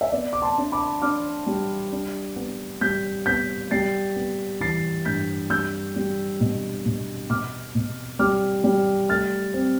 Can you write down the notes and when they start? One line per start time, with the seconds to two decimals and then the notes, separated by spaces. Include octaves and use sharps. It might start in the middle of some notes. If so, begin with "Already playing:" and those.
0.01 E5
0.12 B3 D5
0.33 D6
0.42 A5 C6
0.58 D4
0.72 B5 D6
1.02 D4 D6 F6
1.46 G3
1.92 D4
2.36 B3
2.81 G3 G6 B6
3.26 B3 G6 B6
3.71 G3 A6 C7
4.16 B3
4.60 E3 A6 C7
5.05 G2 G6 B6
5.50 G3 E6 G6
5.96 G3
6.40 B2
6.86 B2
7.30 B2 D6 F6
7.75 B2
8.19 G3 D6 F6
8.64 G3
9.09 A3 F6 A6
9.54 C4